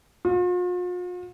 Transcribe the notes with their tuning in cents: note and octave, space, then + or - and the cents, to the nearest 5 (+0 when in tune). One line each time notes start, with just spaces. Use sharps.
F4 +45